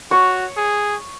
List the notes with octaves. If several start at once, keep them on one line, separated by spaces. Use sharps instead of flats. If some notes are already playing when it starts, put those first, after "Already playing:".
F#4 C#5
G#4